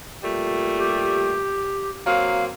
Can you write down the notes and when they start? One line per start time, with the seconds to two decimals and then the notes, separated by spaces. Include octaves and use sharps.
0.23 A#2 G3 A3
0.78 G4
2.06 F#3 A#3 C4 F5